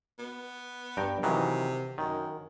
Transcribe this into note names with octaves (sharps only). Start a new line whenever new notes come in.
B3
G2 G5 A#5
C3 D#3 E3 F#3
F#2 D#3